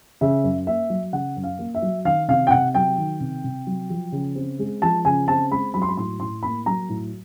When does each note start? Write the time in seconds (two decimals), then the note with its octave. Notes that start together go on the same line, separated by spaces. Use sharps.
0.21 C#3 E5
0.44 F#2
0.67 A#3 E5
0.90 F#3
1.12 C#3 F#5
1.36 F#2
1.44 F5
1.59 A#3
1.75 E5
1.82 F#3
2.05 D#3 F5
2.28 C3 F5
2.47 G5
2.51 C3 F#5
2.75 F#3 G5
2.98 D#3
3.20 C3
3.44 C3
3.67 F#3
3.90 F3
4.12 C#3
4.35 C4
4.59 G#3
4.82 F3 A5
5.05 C#3 G#5
5.28 C4 A5
5.51 G#3 B5
5.74 F#3 B5
5.82 C6
5.89 B5
5.97 A2 C6
6.20 A2 C6
6.43 A#3 B5
6.66 F#3 A#5
6.89 A2